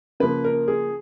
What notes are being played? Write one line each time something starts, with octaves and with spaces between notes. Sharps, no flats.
C#3 F3 A#3 B4
A#4
G#4